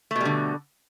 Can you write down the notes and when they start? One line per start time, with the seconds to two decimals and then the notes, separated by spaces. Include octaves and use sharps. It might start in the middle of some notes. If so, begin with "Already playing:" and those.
0.11 A3
0.16 B2
0.21 G3
0.25 D3